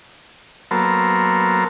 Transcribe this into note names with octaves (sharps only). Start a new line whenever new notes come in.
F#3 A#3 B3 A4 A#4 C5